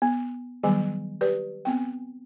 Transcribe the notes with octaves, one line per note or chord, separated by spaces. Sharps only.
B3
D#3 F#3 G3 B3 G#4 G#5
G4 B4 D5
B3 C4 G5